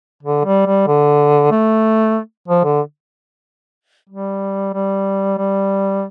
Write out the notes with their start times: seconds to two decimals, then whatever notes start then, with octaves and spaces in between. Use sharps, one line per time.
0.23 D3
0.45 G3
0.66 G3
0.87 D3
1.52 A3
2.48 F3
2.65 D3
4.09 G3
4.74 G3
5.38 G3